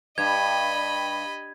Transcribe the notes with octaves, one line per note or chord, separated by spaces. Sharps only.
G2 D#5 B5 G#6